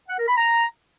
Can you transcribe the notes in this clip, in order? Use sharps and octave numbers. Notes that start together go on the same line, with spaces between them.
F#5
A#4
B5
A#5